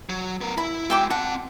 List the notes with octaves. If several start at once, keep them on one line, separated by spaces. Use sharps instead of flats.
F#3
B3 A#4
E4 B5
G#3 F#4 E5 G5 D6
C4 F#5 A5